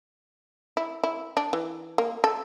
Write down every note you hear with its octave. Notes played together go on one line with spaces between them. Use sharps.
E4
E4
D4
E3
A#3
A4